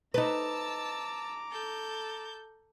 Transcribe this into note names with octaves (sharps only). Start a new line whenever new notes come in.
D#4 B4 A5 A#5 D6 E6
A4 G6